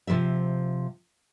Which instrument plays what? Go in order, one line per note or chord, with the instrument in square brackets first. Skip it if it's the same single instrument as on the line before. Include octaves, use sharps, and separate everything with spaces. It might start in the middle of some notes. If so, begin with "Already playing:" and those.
[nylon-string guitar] C3 F3 G#3 G4 E5